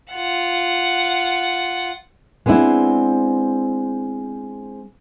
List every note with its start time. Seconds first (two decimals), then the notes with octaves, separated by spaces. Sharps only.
0.12 F4 F#5
2.46 G#3 B3 C4 D4 E4